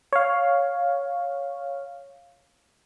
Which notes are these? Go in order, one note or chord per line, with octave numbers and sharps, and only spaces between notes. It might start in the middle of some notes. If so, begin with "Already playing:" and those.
C#5 F5